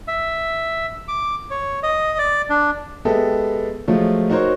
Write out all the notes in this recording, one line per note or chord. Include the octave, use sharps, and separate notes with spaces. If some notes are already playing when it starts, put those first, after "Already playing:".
E5
D6
C#5
D#5
D5
D4
G#3 B3 G4 A4 D#5 E5
F3 F#3 G#3 A3 F4
D#4 F#4 A#4 C5 C#5